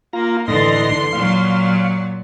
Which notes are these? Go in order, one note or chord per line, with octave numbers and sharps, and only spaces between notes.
A#3 F4 A#5
A2 D3 E3 D#4 C6 A#6
A#2 F#3 F5